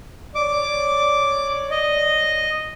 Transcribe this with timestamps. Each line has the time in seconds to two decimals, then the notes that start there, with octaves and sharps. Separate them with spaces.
0.35 C#5 D5 D6
1.71 D#5